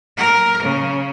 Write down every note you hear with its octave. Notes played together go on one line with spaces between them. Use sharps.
A#4
C#3